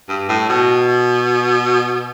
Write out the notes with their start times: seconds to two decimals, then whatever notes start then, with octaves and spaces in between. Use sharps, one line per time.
0.09 G2
0.29 A2
0.49 B2